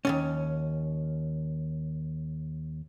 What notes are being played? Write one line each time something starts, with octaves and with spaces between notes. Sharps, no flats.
D#2 G#2 C#4